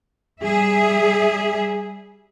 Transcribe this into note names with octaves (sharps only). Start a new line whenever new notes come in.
G3 G#4 E5